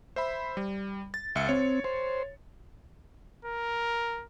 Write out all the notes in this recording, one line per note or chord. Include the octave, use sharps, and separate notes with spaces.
C5 E5 B5
G3
A6
C#2 E5 C#7
C4 C#5
C5
A#4